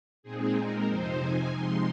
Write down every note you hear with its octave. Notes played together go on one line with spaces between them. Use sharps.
A#2 G#3 C4 D#4 G#4
A#4
F2 C3 F3 C4 D#4 C5
G#5
C3 F3 G#3 D#4 C6